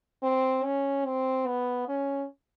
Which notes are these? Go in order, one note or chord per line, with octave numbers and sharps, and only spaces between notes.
C4
C#4
C4
B3
C#4